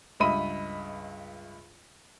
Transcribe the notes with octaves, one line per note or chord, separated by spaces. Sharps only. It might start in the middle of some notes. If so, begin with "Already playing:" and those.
C#2 G2 D#5 E5 B5 D#7